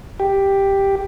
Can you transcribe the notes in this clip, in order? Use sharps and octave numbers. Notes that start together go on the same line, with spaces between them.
G4